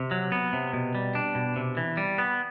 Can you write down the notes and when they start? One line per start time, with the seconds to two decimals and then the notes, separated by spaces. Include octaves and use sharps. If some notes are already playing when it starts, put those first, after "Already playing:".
Already playing: C3
0.11 F#3
0.32 B3
0.53 C3
0.73 B2
0.95 G3
1.15 D4
1.35 B2
1.56 C3
1.77 E3
1.97 G3
2.18 B3